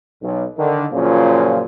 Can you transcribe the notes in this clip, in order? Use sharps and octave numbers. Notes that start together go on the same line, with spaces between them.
B1
D3 D#3
F#2 A#2 C#3 F3